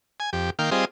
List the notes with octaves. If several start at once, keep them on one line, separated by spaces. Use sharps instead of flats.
G#5
F2 G4
D#3 A#3 F5 G5
G3 C4 F4 G#4 D#5